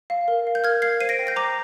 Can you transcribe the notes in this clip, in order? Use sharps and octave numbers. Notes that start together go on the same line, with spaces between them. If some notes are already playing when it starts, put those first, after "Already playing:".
F5
A#4
F5
G6
A#4 F6 G#6
F5 G#6 C7
C5 C7 D#7
A#6 D7
G5
G6 A#6
C5 A#5 D6